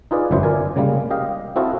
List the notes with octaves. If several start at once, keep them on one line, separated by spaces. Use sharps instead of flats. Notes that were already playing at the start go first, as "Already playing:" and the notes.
D#4 F4 G#4 B4 D5
G1 F#2 F#3 E4 C5
A#4 D5 G#5
C#3 G3 G#3 A#3
G4 D#5 F5
C4 E4 F#4 A4 D#5 F5